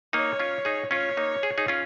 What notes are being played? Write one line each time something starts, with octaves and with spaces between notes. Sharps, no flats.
A#3 D#4 C#5
C#4 F4
D#4 G#4
C#4 F4 C#5
A#3 D#4
G#4
D#4 G#4
C#4 F4